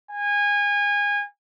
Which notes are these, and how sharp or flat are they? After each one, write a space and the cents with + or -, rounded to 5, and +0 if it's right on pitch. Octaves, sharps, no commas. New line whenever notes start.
G#5 -25